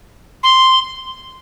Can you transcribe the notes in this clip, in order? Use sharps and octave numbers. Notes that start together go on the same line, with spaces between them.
C6